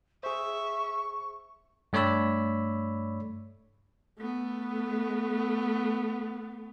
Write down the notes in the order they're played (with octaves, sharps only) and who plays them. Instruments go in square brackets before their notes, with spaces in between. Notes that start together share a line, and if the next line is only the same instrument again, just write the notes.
[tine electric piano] G#4 C5 [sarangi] E5 [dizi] C#6
[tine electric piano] G2 A3 C#5 D5 B5 E6
[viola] A3 B3